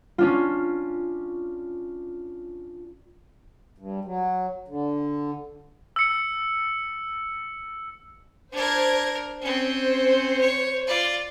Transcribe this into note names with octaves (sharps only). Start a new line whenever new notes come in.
C#4 D4 F4
G2
F#3
D3
E6 C#7
D4 A#4 C5 G#6
C4 C#4 C5
C#5
F4 D5